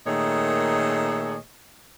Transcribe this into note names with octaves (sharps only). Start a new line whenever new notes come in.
A#2 D#3 A3 G#4 C#5 D#5